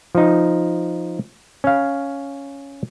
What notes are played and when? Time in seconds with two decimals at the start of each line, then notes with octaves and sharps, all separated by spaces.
0.15 F3 D#4
1.64 C#4 F5